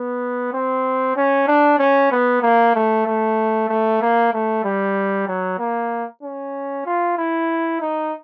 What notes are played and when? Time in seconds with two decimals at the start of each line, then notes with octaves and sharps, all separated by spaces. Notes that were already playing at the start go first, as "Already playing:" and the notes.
Already playing: B3
0.53 C4
1.16 C#4
1.47 D4
1.79 C#4
2.12 B3
2.42 A#3
2.75 A3
3.06 A3
3.69 A3
4.01 A#3
4.33 A3
4.64 G3
5.27 F#3
5.59 A#3
6.23 C#4
6.86 F4
7.17 E4
7.81 D#4